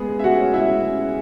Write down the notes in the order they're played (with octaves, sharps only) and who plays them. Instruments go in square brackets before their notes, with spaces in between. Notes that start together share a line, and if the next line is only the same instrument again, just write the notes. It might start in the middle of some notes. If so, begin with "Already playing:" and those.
Already playing: [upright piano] G#3 B3 G#4
C#3
E5
C#3 F#4 F#5
C#4
G#3 E4 E5
C#3
C#3
C#4